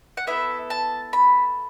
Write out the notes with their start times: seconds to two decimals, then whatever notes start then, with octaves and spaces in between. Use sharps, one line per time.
0.17 F#5
0.27 B3 E4 A4 E5
0.70 A5
1.13 B5